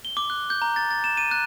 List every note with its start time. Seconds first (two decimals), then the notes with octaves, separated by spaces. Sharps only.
0.05 G7
0.17 D6
0.30 F#6
0.50 G6
0.62 A#5
0.76 A6
0.91 A6
1.04 E7
1.17 D#7
1.31 F#6